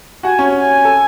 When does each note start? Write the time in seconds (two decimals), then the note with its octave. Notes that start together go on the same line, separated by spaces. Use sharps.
0.23 F#4 F#5 G#5
0.39 C#4 C#5
0.54 G#5
0.85 A4